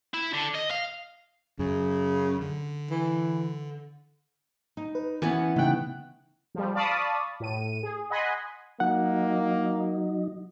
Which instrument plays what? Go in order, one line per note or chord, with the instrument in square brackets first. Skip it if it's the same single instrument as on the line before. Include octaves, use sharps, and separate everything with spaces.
[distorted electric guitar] E4
D3
D#5
F5
[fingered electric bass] F#2 [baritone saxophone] C#3
[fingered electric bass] D3
[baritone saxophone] E3
[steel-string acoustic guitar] D#4
[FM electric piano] B4
[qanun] E3 B3 [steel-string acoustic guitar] C#4 F#5
[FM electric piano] C#3 D#4 F#6 [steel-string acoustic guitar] A3 G5
[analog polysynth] F3 G3
D5 F5 A5 B5 C#6 D#6
A2 D#7
G#4
D#5 F#5 G#5 B5 C6
[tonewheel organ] F#3 D#4 [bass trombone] A#3 [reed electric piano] F#5